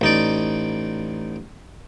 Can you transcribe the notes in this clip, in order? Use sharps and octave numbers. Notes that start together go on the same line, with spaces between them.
A1 D#4 D5